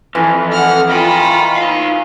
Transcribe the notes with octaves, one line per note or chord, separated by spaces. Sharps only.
F2 E3
F#5 F6
F4 D#5 G5 B5
D#4 F5